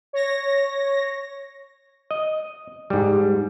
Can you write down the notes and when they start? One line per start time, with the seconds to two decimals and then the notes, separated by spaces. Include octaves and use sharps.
0.13 C#5 A#6
2.11 D#5
2.90 G#2 G3